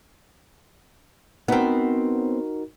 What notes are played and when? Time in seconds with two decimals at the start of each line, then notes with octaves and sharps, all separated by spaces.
1.48 B3 C4 D#4 F#4 A#4